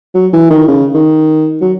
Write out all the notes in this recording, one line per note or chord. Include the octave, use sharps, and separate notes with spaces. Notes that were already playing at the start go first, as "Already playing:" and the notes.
F#3
E3
D#3
C#3
D#3
F#3